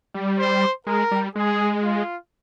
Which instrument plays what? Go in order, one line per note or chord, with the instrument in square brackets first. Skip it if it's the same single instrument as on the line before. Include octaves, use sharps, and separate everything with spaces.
[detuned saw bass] G3
[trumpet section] C5
[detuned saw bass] G#3 [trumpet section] A#4
[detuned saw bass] G3
[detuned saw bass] G#3 [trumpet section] G#4
[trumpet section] F4